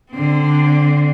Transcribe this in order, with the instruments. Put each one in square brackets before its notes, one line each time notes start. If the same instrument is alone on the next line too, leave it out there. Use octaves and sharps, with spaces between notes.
[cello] D3 C4